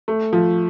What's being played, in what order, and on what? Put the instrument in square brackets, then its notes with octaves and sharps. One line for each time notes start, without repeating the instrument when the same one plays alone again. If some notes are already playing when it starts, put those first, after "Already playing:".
[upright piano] A3
F3